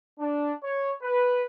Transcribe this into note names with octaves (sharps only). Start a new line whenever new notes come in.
D4
C#5
B4